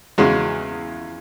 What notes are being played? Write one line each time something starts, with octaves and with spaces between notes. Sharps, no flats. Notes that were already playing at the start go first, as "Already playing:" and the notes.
E2 C#3 G#3 C#4 F#4